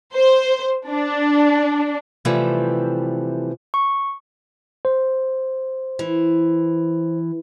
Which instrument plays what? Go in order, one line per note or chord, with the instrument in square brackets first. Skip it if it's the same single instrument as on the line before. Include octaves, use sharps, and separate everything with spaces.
[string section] C5
D4
[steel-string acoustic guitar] C3 E3 F3 G3 A3 C4
[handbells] C#6
[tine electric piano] C5
[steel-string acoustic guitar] E3